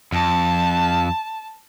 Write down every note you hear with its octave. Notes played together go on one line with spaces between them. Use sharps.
F2 A5